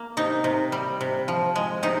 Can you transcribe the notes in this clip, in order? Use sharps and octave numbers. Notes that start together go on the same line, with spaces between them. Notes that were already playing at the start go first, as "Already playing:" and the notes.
Already playing: A#3
C3 D#4
C3
G3
C3
F3
G#3
C3 D#4